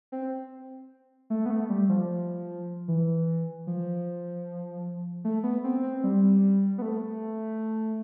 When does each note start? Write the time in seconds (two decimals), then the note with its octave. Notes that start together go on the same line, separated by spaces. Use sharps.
0.12 C4
1.30 A3
1.46 B3
1.51 A3
1.70 G3
1.89 F3
2.88 E3
3.67 F3
5.24 A3
5.44 B3
5.64 C4
5.83 C4
6.04 G3
6.78 B3
6.82 A3